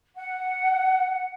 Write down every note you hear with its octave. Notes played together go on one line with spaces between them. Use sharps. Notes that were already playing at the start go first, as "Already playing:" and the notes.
F#5